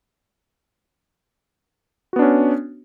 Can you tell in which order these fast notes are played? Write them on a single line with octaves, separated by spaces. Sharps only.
F#4 B3 D4 C#4